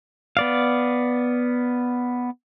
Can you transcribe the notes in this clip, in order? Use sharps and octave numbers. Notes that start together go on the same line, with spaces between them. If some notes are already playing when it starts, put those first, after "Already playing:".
B3 D5 F5